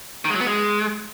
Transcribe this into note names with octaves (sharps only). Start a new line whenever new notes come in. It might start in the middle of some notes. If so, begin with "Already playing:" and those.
D#3
G#3
F#3
B3
G#3